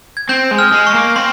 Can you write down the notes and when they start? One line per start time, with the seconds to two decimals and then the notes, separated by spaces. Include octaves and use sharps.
0.17 G#6
0.29 C4 G6
0.51 G#3
0.59 F6
0.72 G#3
0.87 C#6
0.94 A#3
1.16 C4 C6